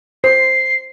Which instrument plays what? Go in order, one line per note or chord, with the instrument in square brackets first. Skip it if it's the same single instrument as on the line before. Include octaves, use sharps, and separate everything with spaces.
[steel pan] C5 [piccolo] C7